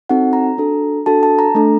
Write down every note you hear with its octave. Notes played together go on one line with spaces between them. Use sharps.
C4 D#4 F#4 A4 F#5
A#5
D4 F#4 A4
D4 F#4 A4 A5
A5
A#5
A3 D4 A4